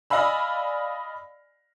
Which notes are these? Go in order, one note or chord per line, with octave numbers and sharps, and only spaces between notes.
D5 D#5 F5 G#5 B5 E6